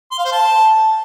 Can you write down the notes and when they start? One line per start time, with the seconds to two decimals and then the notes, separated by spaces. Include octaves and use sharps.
0.11 C6
0.18 F5
0.25 C5
0.32 A5